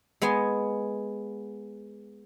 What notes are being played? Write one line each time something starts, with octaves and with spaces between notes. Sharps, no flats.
G#3 B3 D#5 G#5